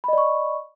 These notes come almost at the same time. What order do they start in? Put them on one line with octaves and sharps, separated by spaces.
B5 D#5 D5 C#6